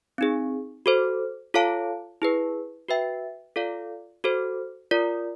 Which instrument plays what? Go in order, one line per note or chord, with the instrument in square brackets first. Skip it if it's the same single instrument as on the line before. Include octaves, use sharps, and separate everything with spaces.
[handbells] C4 D#4 G#4
F#4 A4 C5
F4 A4 C#5 F5 A5
E4 G#4 B4
F#4 B4 E5 G5
F4 A4 D5 F5
F#4 A4 C5
F4 A#4 D5